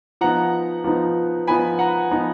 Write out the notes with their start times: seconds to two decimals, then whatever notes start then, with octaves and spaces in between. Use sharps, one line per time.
0.21 F3 B3 D#4 F#5 A#5
0.84 F3 B3 D#4
1.47 F3 B3 D#4 G#5 B5
1.79 F#5 A#5
2.11 F3 B3 D#4